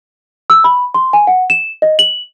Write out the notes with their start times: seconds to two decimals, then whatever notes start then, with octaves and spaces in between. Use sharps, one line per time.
0.50 E6
0.64 B5
0.94 C6
1.13 G#5
1.27 F#5
1.50 E7
1.82 D#5
1.99 F#7